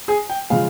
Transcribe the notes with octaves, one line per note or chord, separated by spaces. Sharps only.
G#4 G#5
G5
C#3 F3 G#3 F5